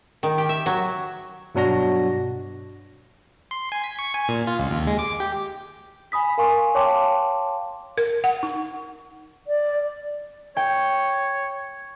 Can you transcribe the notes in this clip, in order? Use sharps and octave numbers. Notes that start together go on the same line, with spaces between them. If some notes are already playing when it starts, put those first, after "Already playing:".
D#3
G4
E5
F#3
G2 B2 F#3 D4 F#4 A#6
C6
G#5
B6
C#6
G#5
A#2
F4
C#2
D#2
G#3
D6
G4
G#5 B5 D#6 B6
A#4 F5 G#5 C6 C#6
C#5 F5 G5 A5 C6 D6
A#4
F#5
D#4
D5
C#5 G5